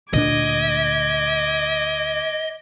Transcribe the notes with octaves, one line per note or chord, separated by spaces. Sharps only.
D2 A#2 D4 D#5 D6 G#6